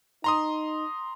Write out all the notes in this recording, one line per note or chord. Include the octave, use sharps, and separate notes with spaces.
D#4 A#5 C6 D#6